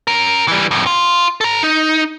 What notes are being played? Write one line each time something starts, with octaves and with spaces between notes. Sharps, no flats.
C#4 A#4
E3 G3
F2 A2
F4
A4 A#5
D#4